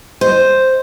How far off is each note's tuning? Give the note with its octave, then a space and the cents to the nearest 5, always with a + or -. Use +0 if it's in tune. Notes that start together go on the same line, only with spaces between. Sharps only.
C5 +0 D#5 +0